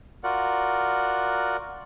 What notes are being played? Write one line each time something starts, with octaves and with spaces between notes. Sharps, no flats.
F4 F#4 A#4 D5 F#5